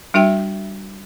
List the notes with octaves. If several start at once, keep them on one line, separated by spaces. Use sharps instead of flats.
G3 D4 F#4 E5 G5